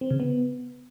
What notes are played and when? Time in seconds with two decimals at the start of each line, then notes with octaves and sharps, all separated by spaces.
0.01 C4
0.10 C#3
0.20 B3